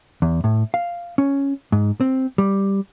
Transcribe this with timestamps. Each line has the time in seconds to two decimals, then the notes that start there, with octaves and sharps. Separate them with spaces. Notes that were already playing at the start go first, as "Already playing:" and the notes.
0.22 E2
0.44 A2
0.74 F5
1.18 C#4
1.72 G#2
2.01 C4
2.38 G3